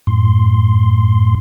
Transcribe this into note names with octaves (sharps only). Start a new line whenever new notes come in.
F#2 A2 C6